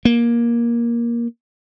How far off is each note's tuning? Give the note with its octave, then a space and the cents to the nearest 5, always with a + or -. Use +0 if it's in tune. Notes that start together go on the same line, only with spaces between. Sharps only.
A#3 +15